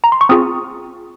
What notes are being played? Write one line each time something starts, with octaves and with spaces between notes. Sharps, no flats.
A#5
C6
C#6
C4 F4 G#4 D#6